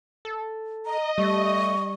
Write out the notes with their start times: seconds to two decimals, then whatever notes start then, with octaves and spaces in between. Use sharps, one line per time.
0.25 A4
0.85 D#5 A#5
1.18 G3 A3 C#6